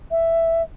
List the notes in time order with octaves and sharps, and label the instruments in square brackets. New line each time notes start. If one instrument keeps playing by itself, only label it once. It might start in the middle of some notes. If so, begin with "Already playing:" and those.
[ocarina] E5